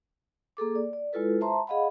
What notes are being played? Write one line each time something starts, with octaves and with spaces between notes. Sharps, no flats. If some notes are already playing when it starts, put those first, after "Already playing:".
A#3 G#4 A4 D6
D5
D5
G#3 E4 F4 A4 B4
C5 E5 A5 A#5 C6
G#4 D#5 F5 F#5 B5